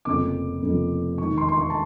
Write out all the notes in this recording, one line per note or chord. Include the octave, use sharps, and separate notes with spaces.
F1 F2 C#3 F3 A#3 D6
F1 F2 C#3 F3 A#3
E1 D#2 D#3 C#6
C6
C6
C#6
A5